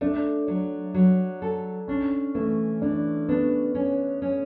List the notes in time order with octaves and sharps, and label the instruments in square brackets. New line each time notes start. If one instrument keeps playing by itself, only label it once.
[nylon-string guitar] A3 [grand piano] D4
[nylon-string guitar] F#3
F#3
A4
[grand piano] C#4 [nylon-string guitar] D4
[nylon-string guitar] E3 [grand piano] A3
[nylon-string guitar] E3 [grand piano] D4
[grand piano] B3 [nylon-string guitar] D4
[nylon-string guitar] C#4
C#4